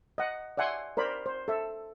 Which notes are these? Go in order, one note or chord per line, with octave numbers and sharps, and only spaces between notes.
D#5 F#5
D5 E5 F#5 G#5 C6
A#4 C5 D5 B5
C5
A4 E5